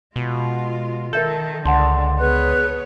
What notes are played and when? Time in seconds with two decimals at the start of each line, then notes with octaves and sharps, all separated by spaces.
0.16 B2 G#3 F4
1.13 D#3 A4 A#4 E5 G6
1.65 C#2 D3 F#5 A5 C6
2.19 B3 G#4 B4 C#5 F#6